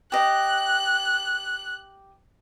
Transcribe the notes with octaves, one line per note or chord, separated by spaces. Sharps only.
G4 D#5 F#6